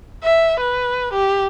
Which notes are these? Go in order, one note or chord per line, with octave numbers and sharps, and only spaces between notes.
E5
B4
G4